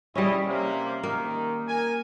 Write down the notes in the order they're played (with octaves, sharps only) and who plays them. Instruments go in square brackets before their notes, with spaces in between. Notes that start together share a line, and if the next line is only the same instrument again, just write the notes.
[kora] G3 C#4 [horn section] E4 G#4 D#5
[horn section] C3 A#3
[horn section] D#3 [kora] A#3
[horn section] A#4 G#5